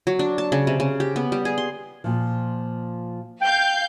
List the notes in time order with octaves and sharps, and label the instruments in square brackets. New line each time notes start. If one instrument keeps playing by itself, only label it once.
[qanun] F#3
D4
A5
C#3
C3
C#3
G4
B3
G3
G#4
C6
[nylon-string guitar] A#2 F3
[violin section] F5 G6 [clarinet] G5